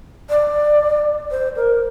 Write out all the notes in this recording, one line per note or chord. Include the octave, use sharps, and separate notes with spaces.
D5
C5
A#4